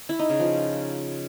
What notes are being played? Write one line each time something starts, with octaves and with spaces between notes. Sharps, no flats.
E4
D#4
C#3
F3